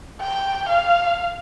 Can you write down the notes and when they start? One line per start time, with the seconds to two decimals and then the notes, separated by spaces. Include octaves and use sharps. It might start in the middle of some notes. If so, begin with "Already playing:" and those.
0.21 G5
0.69 F5